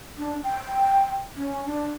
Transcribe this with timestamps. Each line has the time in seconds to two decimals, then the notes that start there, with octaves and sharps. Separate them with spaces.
0.18 D4
0.44 G5
1.36 C#4
1.66 D4